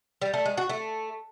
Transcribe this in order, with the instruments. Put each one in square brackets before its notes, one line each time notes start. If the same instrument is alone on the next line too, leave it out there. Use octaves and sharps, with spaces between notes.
[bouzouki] G3
A3
G#3
F#4
A3